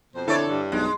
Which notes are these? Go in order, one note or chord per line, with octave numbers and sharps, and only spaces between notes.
F2 B2 C5
D3 E4 A4 C#5 D5
G2
B1 G#3